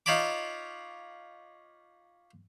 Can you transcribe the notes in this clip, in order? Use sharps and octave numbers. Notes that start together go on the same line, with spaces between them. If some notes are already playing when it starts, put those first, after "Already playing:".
D#4 F4 C#5 A5 B5 D6